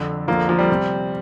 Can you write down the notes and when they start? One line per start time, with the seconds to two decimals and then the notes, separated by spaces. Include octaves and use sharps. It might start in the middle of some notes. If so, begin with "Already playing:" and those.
Already playing: F2 D3
0.28 F2 D3 F3 A#3
0.49 F3 A#3
0.59 G3 C4
0.71 C3